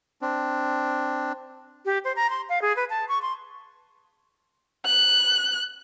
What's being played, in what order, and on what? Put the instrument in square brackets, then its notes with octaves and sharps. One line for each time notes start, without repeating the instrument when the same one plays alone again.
[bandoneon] C4 D4
[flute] G4
C5
A#5
C6
F5
G#4
B4
A5
C#6
C6
[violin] F#6